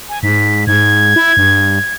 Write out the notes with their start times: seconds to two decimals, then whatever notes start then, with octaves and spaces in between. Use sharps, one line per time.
0.09 G#5
0.23 G#2 B6
0.67 G#2 G#6
1.16 E4
1.37 G2